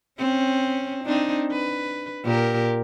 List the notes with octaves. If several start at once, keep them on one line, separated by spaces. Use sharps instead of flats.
C4 C#4
C4 D4 D#4
B4
A#2 G4 A#4